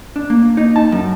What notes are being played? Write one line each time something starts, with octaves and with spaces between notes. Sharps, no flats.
D4
A#3
D#4
A5
F#2